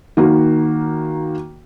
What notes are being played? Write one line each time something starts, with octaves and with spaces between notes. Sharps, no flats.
D#3 A#3 F#4